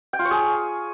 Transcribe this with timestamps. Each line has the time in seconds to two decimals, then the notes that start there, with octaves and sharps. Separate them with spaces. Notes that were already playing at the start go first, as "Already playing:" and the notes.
0.13 G5
0.19 F4
0.25 C#5
0.31 G#4